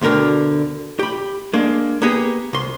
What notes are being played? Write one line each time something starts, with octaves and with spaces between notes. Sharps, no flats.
D2 B2 D3 A#4 G5
G4 B5
G#3 A#3 D4
A#3 B3 G4 G#4
C2 C6